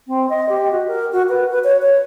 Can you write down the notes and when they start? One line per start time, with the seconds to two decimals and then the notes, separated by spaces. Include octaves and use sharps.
0.07 C4
0.30 D#5
0.49 G4
0.71 F#4
0.88 A#4
1.12 F#4
1.29 B4
1.50 B4
1.64 C#5
1.82 C#5